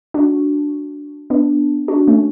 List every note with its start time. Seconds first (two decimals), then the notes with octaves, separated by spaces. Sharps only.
0.14 D4 F#4
1.30 B3 D4
1.88 D4 F#4
2.07 A3 C#4